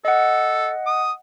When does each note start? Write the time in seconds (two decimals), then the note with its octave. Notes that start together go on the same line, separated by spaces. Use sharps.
0.05 A4 D#5 F#5
0.86 D#6